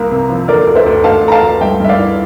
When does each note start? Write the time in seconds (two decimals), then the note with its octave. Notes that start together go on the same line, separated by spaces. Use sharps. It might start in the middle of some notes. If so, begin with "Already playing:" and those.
Already playing: C2 A#3
0.11 C3
0.29 F3
0.48 D3 A#4 D5
0.67 D2
0.75 C5 E5
0.86 D2
1.04 D2 F5 A5
1.23 A3
1.28 A#5
1.32 F5 A5
1.42 D2
1.61 G2 E5 G5
1.80 G2 E5
1.89 D5 F5
1.98 E4